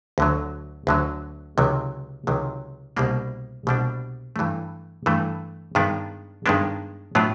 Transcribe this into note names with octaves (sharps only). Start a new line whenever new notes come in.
D2 D3 F#3
D2 D3 F#3
C#2 C3 D#3 F#3
C#2 C3 D#3 F#3
C2 B2 G3 A#3 D4
C2 B2 G3 A#3 D4
G2 E3 A3
G2 E3 A3
G2 D#3 G#3 B3 D4
G2 D#3 G#3 B3 D4
A2 F#3 B3 D4 F4